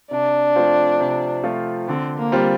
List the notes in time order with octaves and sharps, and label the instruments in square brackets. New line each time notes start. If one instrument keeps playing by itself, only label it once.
[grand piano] C3 [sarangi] D4
[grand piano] F3 A3 C4 F4
C3
F3 A3 C4 F4
[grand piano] D3 [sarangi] C4
[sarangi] A#3
[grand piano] G3 C4 F4